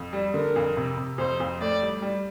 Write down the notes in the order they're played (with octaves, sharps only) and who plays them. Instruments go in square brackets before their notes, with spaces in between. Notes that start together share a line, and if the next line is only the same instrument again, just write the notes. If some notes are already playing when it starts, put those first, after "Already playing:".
Already playing: [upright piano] F2
G3
[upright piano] D3 [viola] A#4
[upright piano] F2
C3
C3
[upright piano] F2 [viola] C5
[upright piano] F2
[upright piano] A2 [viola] D5
[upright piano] G3
G3